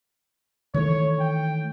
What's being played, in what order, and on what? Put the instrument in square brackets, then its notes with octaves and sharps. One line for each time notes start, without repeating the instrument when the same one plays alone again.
[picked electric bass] D#3 E3 A3 [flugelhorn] C#5
[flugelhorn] G5